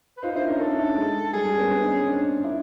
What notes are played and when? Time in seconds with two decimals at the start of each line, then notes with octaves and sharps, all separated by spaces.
0.17 B4
0.23 D#4 F4 C5
0.35 D4 E4 C5
0.47 C#4 D#4 A#4
0.59 C#4 D#4 A4
0.69 D4 E4
0.78 C#4 D#4
0.96 G#3
1.33 G3 G#4
1.45 G3
1.57 B3 C#4
1.70 C4 D4
1.82 C#4 D#4
1.95 C#4 D#4
2.06 C4 D4
2.43 D4 E4